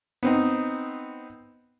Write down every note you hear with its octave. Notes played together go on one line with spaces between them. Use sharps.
B3 C4 D#4